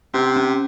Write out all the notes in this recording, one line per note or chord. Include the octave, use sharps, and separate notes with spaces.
C3 C#4
C#4